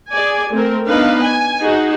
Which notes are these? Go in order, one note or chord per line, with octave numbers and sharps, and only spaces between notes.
G#4 D5 G#5
A3 C4 A#4
B3 D4 D#4 B4 F5
G#5
D#4 F#4 G#4